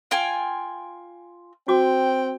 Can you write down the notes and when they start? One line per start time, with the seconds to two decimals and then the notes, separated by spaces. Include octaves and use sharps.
0.11 F4 G5 G#5
1.68 C4 F#4 G5 D6